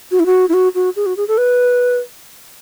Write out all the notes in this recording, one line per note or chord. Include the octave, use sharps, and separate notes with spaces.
F#4
E4
F#4
E4
F#4
F#4
G#4
F#4
G#4
A4
B4